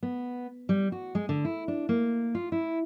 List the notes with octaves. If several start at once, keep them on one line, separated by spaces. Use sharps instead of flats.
B3
G3
F#4
G#3
D3
E4
D4
A#3
F4
E4